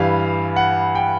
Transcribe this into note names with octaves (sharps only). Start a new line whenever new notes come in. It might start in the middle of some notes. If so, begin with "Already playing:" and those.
Already playing: G2 E3 G3 F5
F#5
G5